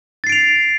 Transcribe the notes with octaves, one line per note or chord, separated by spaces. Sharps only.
A6 C7 D7 F7